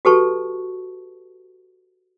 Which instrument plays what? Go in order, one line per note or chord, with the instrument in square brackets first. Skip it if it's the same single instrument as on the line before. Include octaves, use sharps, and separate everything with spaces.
[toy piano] F#4 G4 A4 B4 A5 C#6